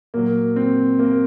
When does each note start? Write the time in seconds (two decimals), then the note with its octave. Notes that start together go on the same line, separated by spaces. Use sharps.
0.14 A#2 F#3 A#3
0.56 C4
0.99 A#3